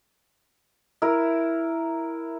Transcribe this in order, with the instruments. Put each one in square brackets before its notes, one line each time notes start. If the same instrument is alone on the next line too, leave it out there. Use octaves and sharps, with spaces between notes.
[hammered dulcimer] E4 A#4